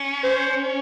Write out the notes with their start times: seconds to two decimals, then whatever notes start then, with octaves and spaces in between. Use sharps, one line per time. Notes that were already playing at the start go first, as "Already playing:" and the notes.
Already playing: C#4
0.24 C5